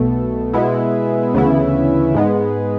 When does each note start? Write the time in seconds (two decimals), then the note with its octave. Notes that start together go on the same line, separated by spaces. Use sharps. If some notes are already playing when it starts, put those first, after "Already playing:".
Already playing: B1 B2 A3
0.53 B2 G#3 B3 E4
1.34 D2 C#3 E3 B3 E4
2.14 G#2 G#3 B3